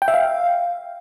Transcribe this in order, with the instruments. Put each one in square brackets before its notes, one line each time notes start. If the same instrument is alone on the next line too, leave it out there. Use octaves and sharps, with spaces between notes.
[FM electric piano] G5
E5
F5